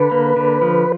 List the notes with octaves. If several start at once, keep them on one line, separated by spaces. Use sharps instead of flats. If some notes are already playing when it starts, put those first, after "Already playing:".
Already playing: D3 B4
A#3
D3
F3